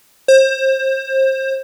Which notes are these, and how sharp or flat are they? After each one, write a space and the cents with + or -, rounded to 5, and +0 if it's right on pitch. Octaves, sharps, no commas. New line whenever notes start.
C5 +30